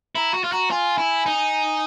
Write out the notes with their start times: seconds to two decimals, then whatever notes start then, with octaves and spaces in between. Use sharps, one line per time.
0.15 E4 A#5
0.34 F#4
0.44 F4
0.52 F#4 A#5
0.70 F4 G#5
0.98 E4
1.26 D#4